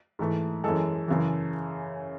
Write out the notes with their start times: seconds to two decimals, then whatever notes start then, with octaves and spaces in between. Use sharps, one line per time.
0.19 G#2 E3 A3
0.64 F#2 E3 G#3 A4
1.08 F#2 C#3 E3